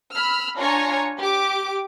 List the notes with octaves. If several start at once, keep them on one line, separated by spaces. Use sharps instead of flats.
B5 E6 F6
D4 F4 C#5 G#5 A#5 C#6
G4 D6